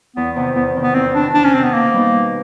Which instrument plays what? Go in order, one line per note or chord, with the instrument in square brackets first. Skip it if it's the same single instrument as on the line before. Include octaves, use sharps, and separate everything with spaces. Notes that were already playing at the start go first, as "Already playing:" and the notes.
[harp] E2 [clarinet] B3
[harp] C3 D#3 [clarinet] B3
[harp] E2 [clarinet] B3
[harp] C3 D#3
[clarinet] B3
[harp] E2 [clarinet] C4
[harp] C3 D#3 [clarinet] D4
[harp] E2 [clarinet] D4
[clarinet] C#4
[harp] C3 D#3 [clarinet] C4
[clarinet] B3
[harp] B2 [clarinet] A#3
[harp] G3 B3 D#4
B2